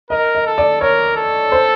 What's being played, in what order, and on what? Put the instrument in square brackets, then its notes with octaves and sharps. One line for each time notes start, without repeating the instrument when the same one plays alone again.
[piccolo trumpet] A#4 [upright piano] D#5
[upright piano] D#5
[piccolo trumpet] A4
[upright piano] D5
[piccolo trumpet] A#4 [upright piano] C#5
[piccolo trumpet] A4
[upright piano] C5